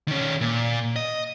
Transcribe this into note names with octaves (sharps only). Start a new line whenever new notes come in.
D#3 C#4
A#2
D#5